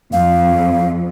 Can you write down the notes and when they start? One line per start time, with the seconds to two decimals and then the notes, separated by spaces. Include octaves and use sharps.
0.13 F2 F5